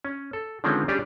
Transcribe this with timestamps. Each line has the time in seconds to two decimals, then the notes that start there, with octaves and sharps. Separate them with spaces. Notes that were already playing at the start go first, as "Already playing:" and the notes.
0.05 C#4
0.33 A4
0.64 D3 D#3 F3 G#3 C4 C#4
0.88 G3 C#4 D4 G4 G#4